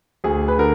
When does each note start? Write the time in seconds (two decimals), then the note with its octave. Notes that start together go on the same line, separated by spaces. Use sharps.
0.24 D2 G#4
0.48 B4
0.58 D3 A#4